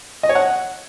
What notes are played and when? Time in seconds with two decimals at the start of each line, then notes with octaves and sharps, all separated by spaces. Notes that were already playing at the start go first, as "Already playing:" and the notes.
0.23 D#5
0.29 C#5
0.35 F#5